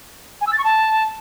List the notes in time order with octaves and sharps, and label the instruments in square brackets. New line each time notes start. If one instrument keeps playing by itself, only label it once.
[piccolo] G#5
E6
A6
C#6
A5